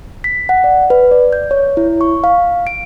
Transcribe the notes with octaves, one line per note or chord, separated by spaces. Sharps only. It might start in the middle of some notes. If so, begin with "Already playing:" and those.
B6
F#5
D5
B4
D5
G6
C#5
E4
C#6
F5
D7